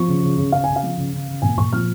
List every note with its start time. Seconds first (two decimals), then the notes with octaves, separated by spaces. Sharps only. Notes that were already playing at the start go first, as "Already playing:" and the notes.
Already playing: F3 C#6
0.08 C#3
0.23 C#3
0.37 C#3
0.52 C#3 F5
0.64 C#3 G#5
0.76 F5
0.83 F3
0.98 C#3
1.13 C#3
1.28 C#3
1.42 A#2 G#5
1.58 A#2 C#6
1.73 F3 F6